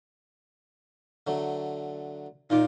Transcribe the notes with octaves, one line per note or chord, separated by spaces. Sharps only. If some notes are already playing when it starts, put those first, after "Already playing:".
D3 F#3 A3
A#2 D#4 F4 D6